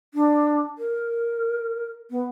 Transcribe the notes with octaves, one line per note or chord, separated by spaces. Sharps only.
D4
A#4
B3